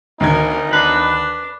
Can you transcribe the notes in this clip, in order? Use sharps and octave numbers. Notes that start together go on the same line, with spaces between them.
D2 D#3 D#4 A#4 G#6
D4 B4